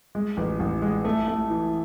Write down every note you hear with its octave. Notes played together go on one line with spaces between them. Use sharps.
G#3
A1
A1
G#3
A3
A3
E3